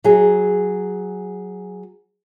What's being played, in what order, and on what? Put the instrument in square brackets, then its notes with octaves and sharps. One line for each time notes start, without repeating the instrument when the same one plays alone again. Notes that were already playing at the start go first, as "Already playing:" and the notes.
[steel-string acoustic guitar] F#3 G#4